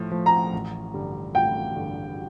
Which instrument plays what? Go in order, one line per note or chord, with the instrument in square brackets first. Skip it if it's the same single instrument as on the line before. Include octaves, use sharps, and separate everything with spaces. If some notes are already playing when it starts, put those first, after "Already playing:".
Already playing: [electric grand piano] A2 F3 A3
F3 A3
[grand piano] A#5
[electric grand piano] A1
G2 D3 G3
[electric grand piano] A1 [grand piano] G5
[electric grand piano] G2 D3 G3